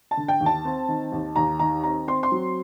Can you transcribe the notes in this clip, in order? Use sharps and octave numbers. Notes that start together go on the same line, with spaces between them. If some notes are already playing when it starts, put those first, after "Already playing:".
A5
D3
G5
D#2
A5
C4
D#3
D#2
D#2 A#5
D#3 A#5
C4 A#5
C4 C6
C6
F#3